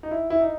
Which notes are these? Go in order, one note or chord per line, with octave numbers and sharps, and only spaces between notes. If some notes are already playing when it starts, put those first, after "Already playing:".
D#4
E4
E4
D#4